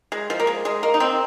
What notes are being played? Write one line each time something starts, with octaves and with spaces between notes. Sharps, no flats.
G#3
F3
A#3
G#3
G#3
A#3
D#4
C4